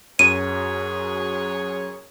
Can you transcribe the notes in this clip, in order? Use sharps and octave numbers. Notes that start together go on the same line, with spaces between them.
F#2 F#3 G#4 C#5 D#7